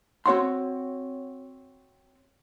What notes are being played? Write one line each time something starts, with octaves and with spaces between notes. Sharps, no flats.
C4 F#4 C#5 F#5 C6